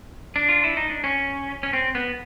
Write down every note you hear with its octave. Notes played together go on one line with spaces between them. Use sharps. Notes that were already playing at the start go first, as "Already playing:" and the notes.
D4
F4
E4
D#4
D4
C#4
C#4
C4
B3